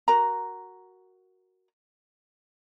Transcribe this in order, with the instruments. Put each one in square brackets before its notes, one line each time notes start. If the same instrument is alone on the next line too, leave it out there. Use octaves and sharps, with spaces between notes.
[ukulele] F#4 A#4 A#5